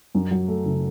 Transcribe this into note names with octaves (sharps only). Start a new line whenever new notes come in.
F#2
F#3
A3
F#1